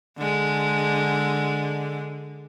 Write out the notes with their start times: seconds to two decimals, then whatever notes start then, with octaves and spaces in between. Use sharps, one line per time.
0.18 D3 G#3